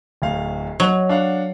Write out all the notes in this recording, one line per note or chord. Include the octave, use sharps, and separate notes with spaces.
D1 D2 F5
F#3 D#5 F7
D4 F5 F#5